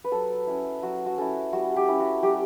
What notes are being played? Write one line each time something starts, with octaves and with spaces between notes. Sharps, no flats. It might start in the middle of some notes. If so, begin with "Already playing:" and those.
B4
F#3 A4
C#4 E4
F#3 F#4
F#4
C#4 E4 A4
G3 F#4
G4
C#4 E4
F#4
G3 G4